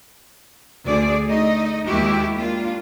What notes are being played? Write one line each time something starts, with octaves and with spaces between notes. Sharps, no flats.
D2 D3 G#4 D5
A3 D#4 D#5
D#2 D#3 G#3 E4 F#4 G4
A#3 D4 F4